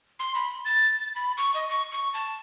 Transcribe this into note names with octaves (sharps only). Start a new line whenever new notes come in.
C6
B5
A6
B5
C#6
D#5
C#6
C#6
A5